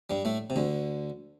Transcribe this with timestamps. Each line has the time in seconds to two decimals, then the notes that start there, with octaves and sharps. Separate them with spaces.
0.10 G2 G3
0.25 A2 A3
0.50 C3
0.56 D2 D3